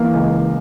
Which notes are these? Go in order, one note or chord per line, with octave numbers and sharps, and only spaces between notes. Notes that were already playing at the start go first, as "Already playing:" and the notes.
Already playing: E3 A#3
C#2